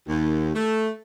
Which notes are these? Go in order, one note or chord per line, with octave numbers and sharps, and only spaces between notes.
D#2
A3